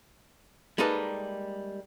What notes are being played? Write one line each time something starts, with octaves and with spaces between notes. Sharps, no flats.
G3 G#3 A#3 D#4 A4 B4